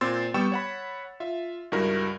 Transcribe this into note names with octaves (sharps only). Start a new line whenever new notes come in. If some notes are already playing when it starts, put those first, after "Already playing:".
A#2 C4 C6 E6 A6
G3 B3 G5 C#6 E6 E7
C#5 F#5 B5
F4 E5
C#2 G2 E4 F#4 A#4